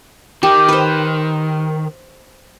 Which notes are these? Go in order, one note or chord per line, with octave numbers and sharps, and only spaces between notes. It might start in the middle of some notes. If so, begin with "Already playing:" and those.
D#3 G4
B4 C5